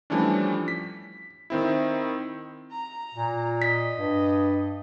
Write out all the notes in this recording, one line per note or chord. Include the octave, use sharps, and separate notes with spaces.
E3 F3 G3 A3 C#4 D4
B6
D#3 C4 E4
A#5
A#2
D#5 B6
G2